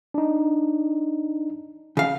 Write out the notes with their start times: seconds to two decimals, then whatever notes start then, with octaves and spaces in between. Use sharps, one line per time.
0.14 D4 D#4
1.97 C#3 F5